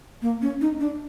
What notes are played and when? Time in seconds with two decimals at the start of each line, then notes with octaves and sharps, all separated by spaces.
0.22 A#3
0.42 C#4
0.61 D#4
0.80 D4